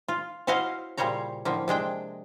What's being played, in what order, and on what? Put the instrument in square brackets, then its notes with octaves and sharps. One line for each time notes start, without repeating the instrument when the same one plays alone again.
[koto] F4
C#4 E4 F#4 C5 D#5 F5
A#2 C#3 G3 C5 C#5 A#5
A2 D3 F3 A#3
C3 G#3 D4 G5